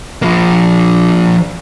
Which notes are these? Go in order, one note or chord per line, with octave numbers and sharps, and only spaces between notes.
F3 A#3